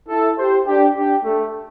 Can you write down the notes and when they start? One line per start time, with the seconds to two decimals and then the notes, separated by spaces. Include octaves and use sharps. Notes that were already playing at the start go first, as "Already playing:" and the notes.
0.09 E4 A4
0.38 G4 C5
0.67 D4 G4
0.96 D4 G4
1.24 A3